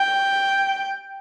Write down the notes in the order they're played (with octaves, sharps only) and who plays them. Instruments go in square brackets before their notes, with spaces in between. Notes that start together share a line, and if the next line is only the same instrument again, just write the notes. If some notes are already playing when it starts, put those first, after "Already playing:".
Already playing: [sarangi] G5